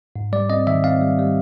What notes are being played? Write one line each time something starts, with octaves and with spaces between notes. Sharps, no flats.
G#2
G3 D5
C4 D#5
D#3 E5
C4 F5
G3
G3